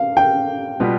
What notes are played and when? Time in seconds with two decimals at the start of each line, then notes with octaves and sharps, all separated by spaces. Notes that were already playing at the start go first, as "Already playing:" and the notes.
Already playing: F5
0.17 G5
0.80 B2 G3 B3 F4